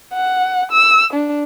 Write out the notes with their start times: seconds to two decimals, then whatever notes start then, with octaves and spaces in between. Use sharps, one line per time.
0.13 F#5
0.71 E6
1.13 D4